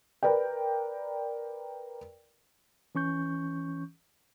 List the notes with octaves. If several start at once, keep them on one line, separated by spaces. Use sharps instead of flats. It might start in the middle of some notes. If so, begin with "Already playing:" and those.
A#4 B4 D5 G5
E3 C#4 C#6 G6